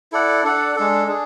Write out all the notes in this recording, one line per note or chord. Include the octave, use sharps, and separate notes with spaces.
E4 A4 D5 F#5
D4 A4 D5 F#5
G#3 D4 A4
D4 G#4